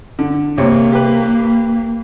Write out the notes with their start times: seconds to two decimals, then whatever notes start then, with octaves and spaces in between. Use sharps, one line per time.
0.19 D3
0.58 C2 C3 A#3 C#5
0.92 G4 B4